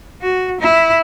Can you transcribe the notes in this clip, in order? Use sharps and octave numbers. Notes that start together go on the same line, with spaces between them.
F#4
E4